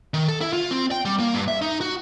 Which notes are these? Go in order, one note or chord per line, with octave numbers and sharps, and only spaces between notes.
D#3
A4
E4
F4
C4
G5
G3
A#3
G2
E5
D#4
F#4